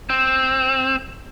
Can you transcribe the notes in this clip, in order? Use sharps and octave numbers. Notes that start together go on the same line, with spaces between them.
C4